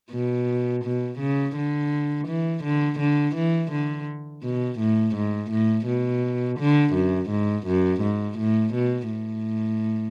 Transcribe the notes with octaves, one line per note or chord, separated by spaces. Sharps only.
B2
B2
C#3
D3
E3
D3
D3
E3
D3
B2
A2
G#2
A2
B2
D3
F#2
G#2
F#2
G#2
A2
B2
A2